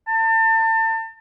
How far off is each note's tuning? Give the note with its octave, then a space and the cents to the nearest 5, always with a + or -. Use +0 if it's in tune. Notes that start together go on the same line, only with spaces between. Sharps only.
A5 +35